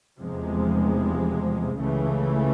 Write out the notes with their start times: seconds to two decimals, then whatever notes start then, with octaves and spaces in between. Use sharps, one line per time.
0.19 F1 E2 C3 F3 G#3
1.79 C#2 C#3 E3 A3